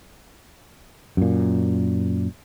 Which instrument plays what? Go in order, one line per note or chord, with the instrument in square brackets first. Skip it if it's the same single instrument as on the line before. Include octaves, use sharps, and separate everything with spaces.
[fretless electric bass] F#2 A#2